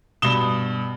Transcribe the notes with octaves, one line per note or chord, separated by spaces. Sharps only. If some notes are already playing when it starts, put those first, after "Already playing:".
G2 B2 D#6 E7 G7